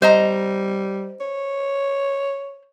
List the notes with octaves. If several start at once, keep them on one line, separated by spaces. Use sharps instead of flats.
G3 C5 D#5 A#5
C#5